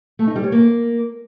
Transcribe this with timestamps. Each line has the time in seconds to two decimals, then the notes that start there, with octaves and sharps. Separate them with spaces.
0.19 A3
0.27 D#4
0.36 G3
0.44 C#5
0.52 A#3